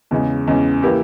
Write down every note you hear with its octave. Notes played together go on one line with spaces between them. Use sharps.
E2 C#3 G#3 C#4
E2 C#3 G#3 C#4
E3 A#3 E4 G4